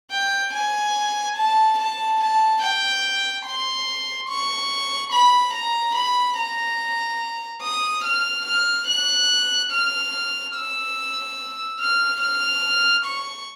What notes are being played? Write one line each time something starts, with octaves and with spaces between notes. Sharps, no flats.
G5
G#5
A5
A5
A5
G5
C6
C#6
B5
A#5
B5
A#5
D#6
F6
F6
F#6
F6
E6
F6
F6
C#6